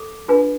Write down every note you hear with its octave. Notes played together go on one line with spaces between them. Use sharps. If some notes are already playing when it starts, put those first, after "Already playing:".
Already playing: A4 D6
D4 F4 G#4 B4